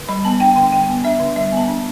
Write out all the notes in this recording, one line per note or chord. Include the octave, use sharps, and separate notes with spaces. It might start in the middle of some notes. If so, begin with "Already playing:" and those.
Already playing: D3
G3 B5
B3 A5
D4 G5
D3 G5
G3 G5
B3
D4 E5
D3
G3 E5
B3 A5
D4